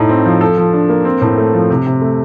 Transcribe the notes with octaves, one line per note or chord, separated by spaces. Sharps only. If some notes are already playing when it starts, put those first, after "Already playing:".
Already playing: A2 D#4
C4
F3
A4
F3
D4
A#3
C4
A2
A3
F3
C3
C3
A3